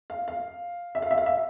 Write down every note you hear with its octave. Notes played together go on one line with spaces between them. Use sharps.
F5
F5
E5
F5
E5
F5
E5